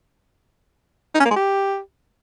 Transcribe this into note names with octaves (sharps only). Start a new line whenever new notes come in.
D#4
C#4
A#3
G#3
G4